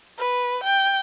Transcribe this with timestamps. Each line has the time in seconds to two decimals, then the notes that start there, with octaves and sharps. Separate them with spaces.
0.18 B4
0.63 G5